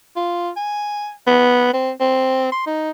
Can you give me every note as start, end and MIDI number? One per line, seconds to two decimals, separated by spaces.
0.16 0.50 65
0.57 1.11 80
1.27 1.73 59
1.73 1.91 60
2.01 2.48 60
2.52 2.62 84
2.66 2.91 63